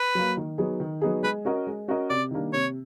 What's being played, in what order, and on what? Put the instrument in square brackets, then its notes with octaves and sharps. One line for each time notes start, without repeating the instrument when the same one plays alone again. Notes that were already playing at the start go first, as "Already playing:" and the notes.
Already playing: [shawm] B4
[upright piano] F#3 A#3
D#3
F#3 B3 D#4 G#4
D#3
F#3 B3 D#4 G#4
[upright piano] G#3 [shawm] B4
[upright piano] C#4 F#4 A#4 D#5
G#3
C#4 F#4 A#4 D#5
[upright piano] C3 [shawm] D5
[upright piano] D#3 G3 A#3 D4
[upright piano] C3 [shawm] C#5